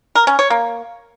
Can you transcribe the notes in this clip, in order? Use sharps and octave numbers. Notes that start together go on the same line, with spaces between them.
A#4
C#4
C#5
A#3